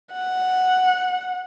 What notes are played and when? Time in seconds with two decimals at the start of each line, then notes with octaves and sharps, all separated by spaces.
0.13 F#5